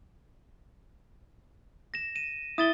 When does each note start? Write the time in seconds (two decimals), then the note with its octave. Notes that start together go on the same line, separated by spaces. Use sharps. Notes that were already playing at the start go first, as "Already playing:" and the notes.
1.94 A#6 E7
2.16 D#7 E7
2.58 E4 D#6 A6 G7